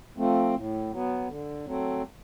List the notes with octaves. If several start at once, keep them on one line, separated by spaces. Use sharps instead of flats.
F3 A3 C4
A2
F#3 B3
D3
F#3 A3 C4